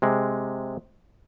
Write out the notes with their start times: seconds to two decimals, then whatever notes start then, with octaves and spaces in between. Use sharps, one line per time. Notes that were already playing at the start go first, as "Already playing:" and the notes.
0.02 C3 G#3